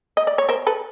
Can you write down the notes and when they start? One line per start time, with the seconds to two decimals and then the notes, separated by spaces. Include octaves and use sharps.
0.17 D#5
0.27 D5
0.38 C#5
0.49 A#4 C5
0.67 A4 B4